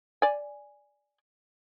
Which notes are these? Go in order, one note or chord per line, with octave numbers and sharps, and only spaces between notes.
D5 G#5